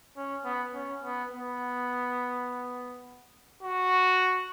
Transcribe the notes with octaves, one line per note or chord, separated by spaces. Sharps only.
C#4
B3
C#4
B3
B3
F#4